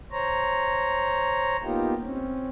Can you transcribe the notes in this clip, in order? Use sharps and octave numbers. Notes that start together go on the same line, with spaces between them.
C5 C#5 A#5
A#3 B3 D#4 F4 G4
C4 C#4